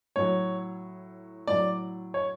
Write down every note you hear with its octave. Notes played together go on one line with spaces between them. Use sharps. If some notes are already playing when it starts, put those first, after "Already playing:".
A2 F#3 C#5
A2 F#3 D5
C#5